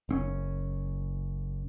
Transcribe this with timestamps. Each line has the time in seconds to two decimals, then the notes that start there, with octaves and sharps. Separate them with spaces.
0.09 F#1 C4 C#4